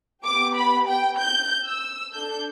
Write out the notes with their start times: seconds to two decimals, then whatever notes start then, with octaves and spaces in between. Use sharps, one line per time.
0.24 B3 G4 D6
0.56 B5
0.88 G5
1.19 G6
1.66 E6
2.13 D4 A4 G6